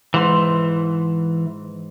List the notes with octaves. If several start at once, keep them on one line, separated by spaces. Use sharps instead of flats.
G#2 E3 C6